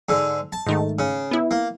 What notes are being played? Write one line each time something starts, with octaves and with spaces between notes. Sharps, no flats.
G#2 D3
A5
G#2 D#3 A3
C#3
B3 E4
A#3